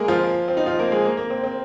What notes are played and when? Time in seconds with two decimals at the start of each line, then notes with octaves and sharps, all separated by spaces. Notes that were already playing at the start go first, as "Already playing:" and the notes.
Already playing: G#3 A#3 G#4 A#4
0.08 F3 F4
0.48 C4
0.57 D#4
0.66 F3 F4
0.79 A#3 A#4
0.92 G#3 G#4
1.05 A#3
1.17 A#3
1.30 C4
1.44 C4